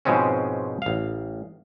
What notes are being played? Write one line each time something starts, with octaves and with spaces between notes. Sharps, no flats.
G#2 B2 F3 G#3 C4 C#4
A1 F5